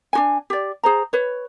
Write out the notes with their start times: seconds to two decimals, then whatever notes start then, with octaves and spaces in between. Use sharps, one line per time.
0.13 D4 F#4 G#5
0.50 G4 D5
0.83 G#4 C5 A#5
1.13 B4 C#5